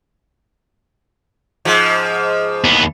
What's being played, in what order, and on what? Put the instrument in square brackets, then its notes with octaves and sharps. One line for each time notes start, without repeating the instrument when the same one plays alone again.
[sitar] G#2 F3
[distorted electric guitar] D#2 B3